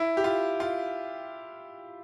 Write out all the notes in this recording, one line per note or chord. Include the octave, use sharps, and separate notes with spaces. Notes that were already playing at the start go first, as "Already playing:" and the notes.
Already playing: E4
G4
F4
F4